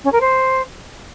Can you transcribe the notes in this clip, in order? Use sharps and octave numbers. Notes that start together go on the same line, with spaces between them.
C#4
A#4
C5